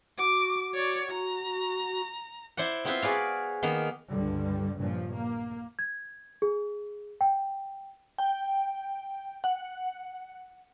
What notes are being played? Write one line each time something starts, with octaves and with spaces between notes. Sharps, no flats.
F#4 D6
C#5 D5
A#5
E4 C5 D5 F#5
B3 C4 E4 F4 B4 C5
F#4 G#4 B4 D5 F5
D#3 A#3 B3
C#2 G2 D3 G3
A#1 G2 A#2 C#3 F3
A#3
G#6
G#4
G5
G5
F#5